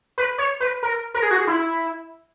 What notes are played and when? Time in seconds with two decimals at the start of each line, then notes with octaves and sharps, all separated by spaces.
0.18 B4
0.38 C#5
0.60 B4
0.83 A#4
1.14 A#4
1.23 G#4
1.31 F#4
1.39 G#4
1.47 E4